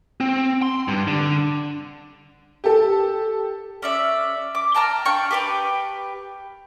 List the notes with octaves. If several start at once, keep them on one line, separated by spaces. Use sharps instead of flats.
C4
C6
G2
D3
G4 A4
C#4 D5 E5
D6
G5 A5 A#5 F6
D4 F5 G5 C#6
G4 B4 G5